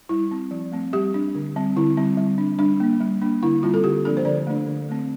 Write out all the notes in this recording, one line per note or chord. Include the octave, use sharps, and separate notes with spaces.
G3 E4
C4
F3
A3 C4
G3 G4
D4
D3
G3 C4
D3 E4
G3 C4
G3
D4
G3 D4
A#3 D4
G3
A#3 D4
D3 E4
G3 C4 F4
A4
D3 G4
F3 A#3 D4 A4
C5
D3 D5
A3 D4
D3
A3 C4